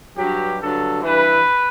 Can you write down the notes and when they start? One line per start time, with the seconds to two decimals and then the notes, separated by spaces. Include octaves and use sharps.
0.17 G2 F#3 G4
0.59 G2 D3 F#3 A4
1.02 G2 E3 B4